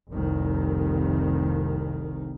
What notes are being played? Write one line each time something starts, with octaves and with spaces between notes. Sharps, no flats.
F1 C2 D#3